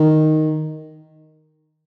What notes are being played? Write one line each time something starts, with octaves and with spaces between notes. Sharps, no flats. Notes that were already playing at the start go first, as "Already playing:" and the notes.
Already playing: D#3